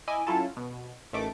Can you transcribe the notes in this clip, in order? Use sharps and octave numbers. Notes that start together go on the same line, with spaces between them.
E4 D#5 G#5 D6
F#3 C#4 E4 F4 A4 A5
B2
A1 D#3 A3 D6